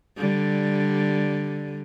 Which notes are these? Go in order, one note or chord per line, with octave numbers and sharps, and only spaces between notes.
D3 G3